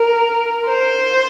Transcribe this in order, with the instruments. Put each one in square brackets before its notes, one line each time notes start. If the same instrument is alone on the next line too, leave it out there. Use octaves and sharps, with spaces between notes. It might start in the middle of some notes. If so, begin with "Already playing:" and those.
Already playing: [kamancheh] A#4
C5